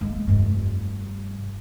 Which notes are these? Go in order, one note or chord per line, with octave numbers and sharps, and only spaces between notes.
G#3 A#3
F1 G2